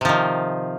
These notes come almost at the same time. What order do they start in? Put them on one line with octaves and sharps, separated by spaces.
C3 F3 D#3